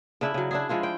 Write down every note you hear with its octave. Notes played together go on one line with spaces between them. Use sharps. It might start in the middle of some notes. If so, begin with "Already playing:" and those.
C#3 D4 E4
C#3 F#3
D4 E4 G#4
F3 G#3 E4 F4
G5